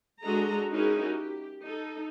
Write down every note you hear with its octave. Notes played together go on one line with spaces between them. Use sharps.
G#3 D4 F#4 A4 D#5 A#5
C#4 D#4 E4 F#4 G#4 A#4
G4
D#4 A4